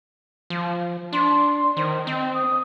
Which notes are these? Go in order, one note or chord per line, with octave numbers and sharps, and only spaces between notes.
F3
D4 C6
D#3 C5
C4 D#5
D#6